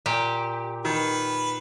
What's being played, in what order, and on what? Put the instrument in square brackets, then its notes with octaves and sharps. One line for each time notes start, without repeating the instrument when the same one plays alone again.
[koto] A#2 G4
[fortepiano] D#3 [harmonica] B4